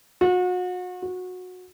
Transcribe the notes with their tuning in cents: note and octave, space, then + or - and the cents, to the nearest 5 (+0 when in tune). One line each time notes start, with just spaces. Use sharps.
F#4 -35
F#4 -20